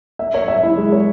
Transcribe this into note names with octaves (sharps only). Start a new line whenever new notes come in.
E5
C#5
E5
E4
G#3
C#5